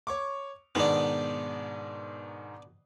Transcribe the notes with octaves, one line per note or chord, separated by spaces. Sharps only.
C#5 C#6 D6
G#2 B2 D#3 B3 D4